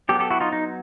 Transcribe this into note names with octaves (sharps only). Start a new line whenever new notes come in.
F#3 B3 G4 A4
G4 A4
E4 F#4
D#4 F4
D#4